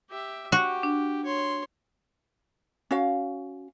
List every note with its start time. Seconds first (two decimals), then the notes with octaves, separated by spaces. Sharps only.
0.10 G4 E5
0.52 F#4 G4
0.83 D4
1.25 C#5 C6
2.91 C#4 F#4 F5